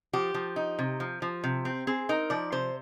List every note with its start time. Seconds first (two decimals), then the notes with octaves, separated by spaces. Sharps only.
0.13 F3 G4
0.34 F3
0.56 D#4
0.79 C3
1.00 F3
1.22 F3
1.44 C3
1.65 C4
1.87 C4 G#4
2.09 D#4 A#4
2.30 F3 D5
2.52 C3 C5